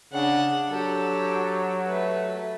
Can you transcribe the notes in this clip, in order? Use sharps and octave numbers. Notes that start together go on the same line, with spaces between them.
C#3 D4 F#5
F#3 G4 A4
A3 B4